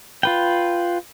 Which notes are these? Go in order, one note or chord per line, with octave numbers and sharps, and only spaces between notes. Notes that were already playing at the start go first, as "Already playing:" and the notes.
F4 B4 G5